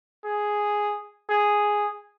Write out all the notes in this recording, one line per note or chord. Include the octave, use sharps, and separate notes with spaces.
G#4
G#4